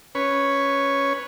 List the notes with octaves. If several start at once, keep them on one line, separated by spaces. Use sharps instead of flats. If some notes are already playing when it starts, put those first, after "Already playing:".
C#4 B4 C#5